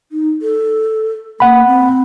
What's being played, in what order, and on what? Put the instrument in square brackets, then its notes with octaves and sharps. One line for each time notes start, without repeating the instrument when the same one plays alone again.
[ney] D#4
A4
[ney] A#3 [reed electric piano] F#5 B5
[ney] C4